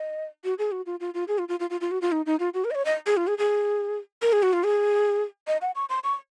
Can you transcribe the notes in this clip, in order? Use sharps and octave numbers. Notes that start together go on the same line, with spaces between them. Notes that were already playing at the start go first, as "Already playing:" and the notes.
Already playing: D#5
F#4
G#4
F#4
F4
F4
F4
G#4
F4
F4
F4
F4
F4
F#4
F4
D#4
D#4
F4
F#4
A#4
D#5
C#5
D#5
G#4
F4
G#4
G#4
A#4
G#4
F#4
F4
G#4
D#5
F#5
C#6
C6
C#6